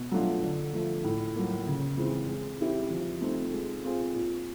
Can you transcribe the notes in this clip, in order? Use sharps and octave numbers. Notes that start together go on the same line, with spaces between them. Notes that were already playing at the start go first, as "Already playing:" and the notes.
Already playing: B2
F#3 A3 D4 F4
D3
F3 A3
A2
F#3 A#3
C#3
E3 G#3 C4
G#3
C4 E4 G4
F3
A3 C4 D#4
G#3
C4 F4 G#4
A#2